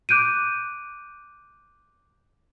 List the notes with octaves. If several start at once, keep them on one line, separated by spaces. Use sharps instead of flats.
D6 F#6 G6 D7 D#7